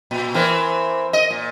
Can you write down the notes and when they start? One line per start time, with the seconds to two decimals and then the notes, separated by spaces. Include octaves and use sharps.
0.11 A#2
0.34 E3 C4 A#4
1.13 D#5
1.30 A#2